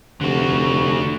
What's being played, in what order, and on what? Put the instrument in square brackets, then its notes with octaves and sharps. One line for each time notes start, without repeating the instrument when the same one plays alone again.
[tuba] F1 [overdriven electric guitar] D3 F#4